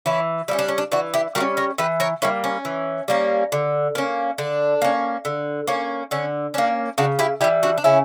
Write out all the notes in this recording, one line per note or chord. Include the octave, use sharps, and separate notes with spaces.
E3 C#4 E4
G3 A#3 C#4 E4
D4
C#4
D4
E3 D4 F#4
E4 G4
G3 A#3 F#4 A#4
C#4
A#4 C#5
E3 G4 B4
A#4 C#5
G3 A#3 C#4 E4
C#4
E3
G3 A#3 C#4
D3
A#3 C#4
D3 D4
A#3 C#4
D3
A#3 C#4
D3 C#4
A#3 C#4 D4
C#3 D4 F#4
E4 G4
E3 G3 E4 G4
D4 F#4
D4
C#3 C#4 E4